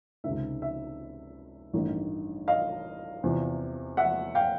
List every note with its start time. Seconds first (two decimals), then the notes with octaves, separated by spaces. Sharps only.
0.24 C#2 C3 D#3 E5
0.62 E5
1.73 A1 G2 D#3
2.48 D#5 F5
3.23 E2 C3 F3
3.97 E5 F#5
4.35 F5 G5